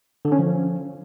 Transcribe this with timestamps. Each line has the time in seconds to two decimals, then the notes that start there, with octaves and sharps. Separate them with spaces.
0.25 D3
0.32 C#4
0.39 F3